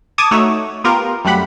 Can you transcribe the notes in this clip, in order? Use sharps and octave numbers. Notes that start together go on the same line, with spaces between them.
A5 D6 D#6 G#6 A6 C#7
A3 D#4 F#4 C#5 E5
B3 F4 G4 A#4
F#2 G3 A3 G4 F#5 B5